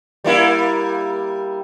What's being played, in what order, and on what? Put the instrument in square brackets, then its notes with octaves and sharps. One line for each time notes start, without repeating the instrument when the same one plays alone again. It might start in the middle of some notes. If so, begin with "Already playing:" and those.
[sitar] G3 A#3 E4